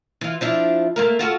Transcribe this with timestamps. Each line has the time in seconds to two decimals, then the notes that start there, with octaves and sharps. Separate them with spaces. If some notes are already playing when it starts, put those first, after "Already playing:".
0.21 E3 F4
0.41 F3 D4 E4
0.96 A3 A#3 A#4
1.19 F4 F#4 A4